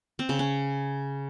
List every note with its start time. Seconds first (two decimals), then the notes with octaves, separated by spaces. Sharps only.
0.19 C4
0.29 C#3
0.39 C#4